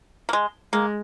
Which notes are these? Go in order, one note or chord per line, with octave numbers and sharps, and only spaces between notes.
A#3
G#3
G#3 A#3